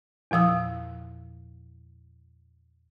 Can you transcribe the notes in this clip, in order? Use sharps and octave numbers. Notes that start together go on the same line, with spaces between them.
E2 A#2 F3 D#6 E6